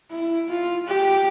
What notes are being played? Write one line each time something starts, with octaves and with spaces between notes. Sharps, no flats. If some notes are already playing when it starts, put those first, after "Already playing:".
E4
F4
G4